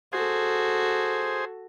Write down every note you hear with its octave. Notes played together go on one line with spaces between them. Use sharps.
F#4 G#4 A4 C5